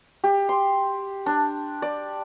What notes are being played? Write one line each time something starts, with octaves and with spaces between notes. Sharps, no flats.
G4
C6
D4
D5